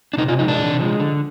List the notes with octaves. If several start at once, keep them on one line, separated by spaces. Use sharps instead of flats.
D4
C3 D#4
F4
F3 G#3 D#4
D4
C3
F3 G#3
D3